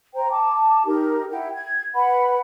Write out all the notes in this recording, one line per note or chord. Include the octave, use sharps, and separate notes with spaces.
C5 G5 A#5
A5 D6
D#4 G4 A#4
E4 F#5 G5
G#6
B4 F#5 B5